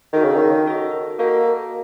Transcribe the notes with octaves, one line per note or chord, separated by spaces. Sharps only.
D#3 F#4 A4 D#5
C#3
D#3
F#4 A4 D#5
A#3 F#4 A4 D#5